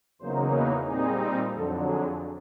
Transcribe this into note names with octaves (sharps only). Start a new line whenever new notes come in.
E2 C#3 F#3 A#3 D#4 C5
B4
A#2 G3 C4 D#4 G#4
F2 D3 F#3 A4
G#4